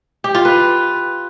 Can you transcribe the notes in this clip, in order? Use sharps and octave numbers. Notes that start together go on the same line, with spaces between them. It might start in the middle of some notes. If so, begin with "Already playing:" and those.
G4
F4
B4